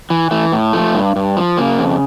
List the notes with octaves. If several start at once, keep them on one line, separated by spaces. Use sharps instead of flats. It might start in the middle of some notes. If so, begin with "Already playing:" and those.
E3
E3 A3
A2
F3 A3
G2
G2
F3
C#3 A#3
F2